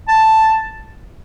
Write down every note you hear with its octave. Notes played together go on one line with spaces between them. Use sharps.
A5